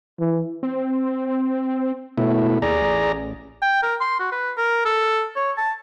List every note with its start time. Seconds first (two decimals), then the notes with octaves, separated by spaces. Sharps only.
0.19 E3
0.63 C4
2.18 B2 A3 E4
2.62 D#2 G#4 D5 A#5
2.82 A1
3.62 G5
3.83 A#4
4.01 C6
4.19 F#4
4.32 B4
4.57 A#4
4.85 A4
5.36 C#5
5.58 A5